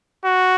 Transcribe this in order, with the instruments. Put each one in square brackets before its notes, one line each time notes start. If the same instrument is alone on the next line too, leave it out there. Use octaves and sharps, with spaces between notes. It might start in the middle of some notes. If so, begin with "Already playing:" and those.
[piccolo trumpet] F#4